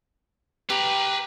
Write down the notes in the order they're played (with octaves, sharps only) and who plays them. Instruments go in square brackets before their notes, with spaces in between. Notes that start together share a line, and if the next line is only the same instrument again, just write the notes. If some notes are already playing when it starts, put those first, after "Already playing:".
[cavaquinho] G4 [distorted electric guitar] B4 A#5